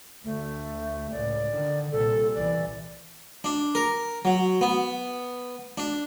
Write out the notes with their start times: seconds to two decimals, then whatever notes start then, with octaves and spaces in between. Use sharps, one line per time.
0.24 D2 A3
1.12 C#2 A2 D5
1.51 D3 D#3
1.92 C2 A#2 A4
2.35 C2 B2 E3 D5
3.44 D4
3.75 A#4
4.25 F#3
4.61 B3
5.78 D4